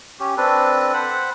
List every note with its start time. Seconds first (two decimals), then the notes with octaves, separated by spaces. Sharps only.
0.20 C#4 G4
0.37 C4 D4 A4 B4
0.94 C5 F#5 B5